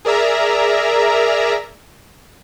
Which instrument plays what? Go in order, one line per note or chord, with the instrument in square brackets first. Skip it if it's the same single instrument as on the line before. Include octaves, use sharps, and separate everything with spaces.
[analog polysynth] G#4 A#4 D5 E5 A#5